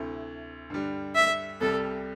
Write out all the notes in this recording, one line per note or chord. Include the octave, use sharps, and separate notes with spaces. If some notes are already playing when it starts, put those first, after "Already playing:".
Already playing: D2 C3 A3 E4
G2 D3 G3
E5
C2 C3 G3 A4